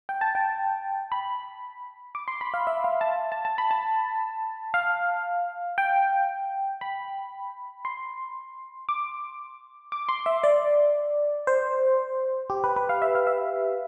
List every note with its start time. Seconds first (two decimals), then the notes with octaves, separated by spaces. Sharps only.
0.09 G5
0.21 A5
0.35 G5
1.12 B5
2.15 D6
2.28 C6
2.41 B5
2.54 F5
2.67 E5
2.84 F5
3.01 A5
3.32 A5
3.45 A5
3.58 B5
3.71 A5
4.74 F5
5.78 G5
6.81 B5
7.85 C6
8.89 D6
9.92 D6
10.09 C6
10.26 E5
10.44 D5
11.47 C5
12.50 G4
12.64 B4
12.76 B4
12.89 F5
13.02 E5
13.15 F5
13.27 E5